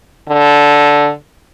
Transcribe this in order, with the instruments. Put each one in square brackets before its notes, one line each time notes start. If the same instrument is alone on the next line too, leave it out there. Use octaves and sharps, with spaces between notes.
[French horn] D3